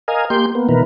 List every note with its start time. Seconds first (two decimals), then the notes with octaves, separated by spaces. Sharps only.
0.08 A#4 D#5 F5 G#5
0.30 A#3 G4 C6 G6
0.55 A#3 B3
0.69 B2 D#3 E3 A#4 B4